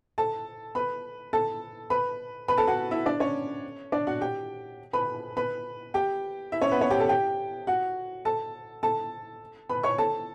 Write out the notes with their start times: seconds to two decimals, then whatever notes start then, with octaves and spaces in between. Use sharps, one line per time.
0.18 A4 A5
0.75 B4 B5
1.33 A4 A5
1.90 B4 B5
2.48 B4 B5
2.58 A4 A5
2.67 F#4 F#5
2.91 E4 E5
3.06 D4 D5
3.20 C#4 C#5
3.92 D4 D5
4.07 F#4 F#5
4.21 G4 G5
4.93 B4 B5
5.37 B4 B5
5.94 G4 G5
6.52 E4 E5
6.62 C#4 C#5
6.71 B3 B4
6.81 C#4 C#5
6.90 G4 G5
7.00 A4 A5
7.09 G4 G5
7.67 F#4 F#5
8.25 A4 A5
8.83 A4 A5
9.70 B4 B5
9.83 C#5 C#6
9.98 A4 A5